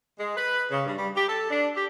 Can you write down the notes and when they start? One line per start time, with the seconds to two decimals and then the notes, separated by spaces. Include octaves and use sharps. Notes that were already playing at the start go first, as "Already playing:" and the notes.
0.20 G#3
0.37 B4
0.71 C#3
0.86 G2
0.98 G3
1.15 G4
1.28 A4
1.50 D4
1.76 G4